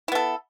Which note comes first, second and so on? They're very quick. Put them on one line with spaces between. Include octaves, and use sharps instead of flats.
E4 B3 A4